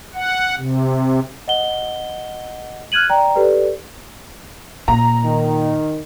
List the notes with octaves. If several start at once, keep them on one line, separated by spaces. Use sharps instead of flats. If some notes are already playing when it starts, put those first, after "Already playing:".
F#5
C3
D#5 F#5 G7
F6 F#6 G#6 D#7 F#7
D5 G5 A#5
G4 A4 B4 D5
A#2 A#5
D#3